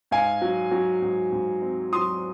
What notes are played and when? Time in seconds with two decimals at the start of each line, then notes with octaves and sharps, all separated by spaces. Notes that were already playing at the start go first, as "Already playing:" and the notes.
0.11 G#2 F5 G#5
0.42 F#3
0.71 F#3
1.02 G#2
1.32 G#2
1.62 C4
1.93 F#3 C6 D#6